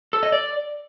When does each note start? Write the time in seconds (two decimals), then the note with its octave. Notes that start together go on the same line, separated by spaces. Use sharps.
0.13 A4
0.23 D#5
0.32 D5